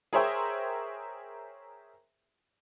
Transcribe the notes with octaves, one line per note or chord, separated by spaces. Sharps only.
G#4 A#4 C5 C#5 E5 G5